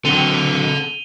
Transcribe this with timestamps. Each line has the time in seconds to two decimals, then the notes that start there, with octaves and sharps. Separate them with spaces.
0.05 D3 F#3 C4 A4 F#5 D#7 F7 G7